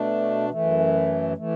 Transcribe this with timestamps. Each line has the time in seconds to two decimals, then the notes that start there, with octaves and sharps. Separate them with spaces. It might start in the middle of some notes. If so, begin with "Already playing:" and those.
Already playing: B2 A3 D4
0.50 F#2 E3 A3
1.36 E3 A3